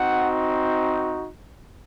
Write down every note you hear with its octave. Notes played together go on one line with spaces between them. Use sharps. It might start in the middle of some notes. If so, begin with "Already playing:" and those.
Already playing: C4 D#4 F#4 F#5